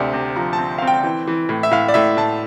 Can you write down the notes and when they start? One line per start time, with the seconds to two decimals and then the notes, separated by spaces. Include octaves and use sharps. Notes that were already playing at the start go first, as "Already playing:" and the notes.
Already playing: D2 C3 D5
0.13 C3
0.36 F3 A#5
0.53 A5
0.59 C4
0.78 F5
0.82 C4
0.87 G5
1.04 E3
1.27 E3
1.49 A2
1.63 E5
1.71 A2 F5
1.88 D5
1.94 A2 E5
2.17 A2 A5